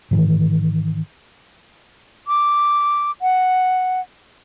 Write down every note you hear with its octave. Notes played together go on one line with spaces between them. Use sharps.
G#2 D#3 E3
D6
F#5